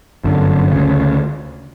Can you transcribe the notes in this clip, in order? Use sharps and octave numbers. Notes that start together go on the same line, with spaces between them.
G1 F#2 D3
D2 C#3